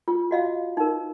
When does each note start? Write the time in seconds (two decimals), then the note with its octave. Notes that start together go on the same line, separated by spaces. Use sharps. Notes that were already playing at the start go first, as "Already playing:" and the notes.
0.08 F4
0.31 F#4 D#5 F5
0.77 D#4 A#4